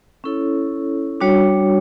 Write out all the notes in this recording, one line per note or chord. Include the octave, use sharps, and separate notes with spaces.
C#4 E4 A4 C#5
G3 D4 F#4 C#5